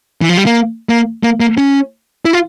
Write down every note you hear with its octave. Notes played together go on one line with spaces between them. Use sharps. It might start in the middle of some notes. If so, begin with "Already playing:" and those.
E3
F3
G3
A#3
A#3
A#3
A#3
C#4
E4
F4